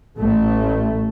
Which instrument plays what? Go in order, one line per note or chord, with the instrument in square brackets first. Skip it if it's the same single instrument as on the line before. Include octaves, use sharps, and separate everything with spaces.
[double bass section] A1 A3